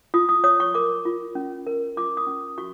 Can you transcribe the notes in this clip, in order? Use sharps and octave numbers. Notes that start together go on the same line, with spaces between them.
F4 D#6
D#6
C#5 D#6
C#6
A#4 D6
F4
C#4
A#4
F4 D6
D#6
C#4
F#4 C#6